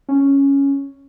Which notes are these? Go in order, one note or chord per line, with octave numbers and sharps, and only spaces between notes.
C#4